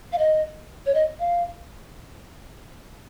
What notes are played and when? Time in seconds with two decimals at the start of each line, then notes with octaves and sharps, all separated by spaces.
0.13 F5
0.19 D#5
0.86 C#5
0.94 D#5
1.20 F5